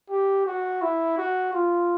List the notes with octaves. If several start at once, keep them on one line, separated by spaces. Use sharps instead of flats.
G4
F#4
E4
F#4
F4